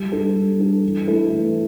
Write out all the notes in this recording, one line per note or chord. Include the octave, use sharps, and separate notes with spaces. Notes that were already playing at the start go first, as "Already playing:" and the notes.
Already playing: G3
D4 A4
G3
D4 A4
E3
A3 E4 A4
E3